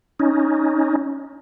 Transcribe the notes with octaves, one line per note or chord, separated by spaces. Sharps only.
C#4 D#4